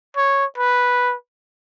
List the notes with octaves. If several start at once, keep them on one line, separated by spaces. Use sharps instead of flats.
C#5
B4